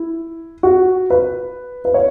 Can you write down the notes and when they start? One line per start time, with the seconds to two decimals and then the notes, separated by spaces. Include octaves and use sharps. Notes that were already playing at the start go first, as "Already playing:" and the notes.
Already playing: E4
0.63 F#4
1.10 B4
1.85 B4
1.94 C#5